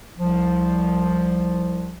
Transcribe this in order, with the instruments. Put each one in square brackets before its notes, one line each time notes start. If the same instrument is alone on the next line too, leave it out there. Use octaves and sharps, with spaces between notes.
[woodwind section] C2 F3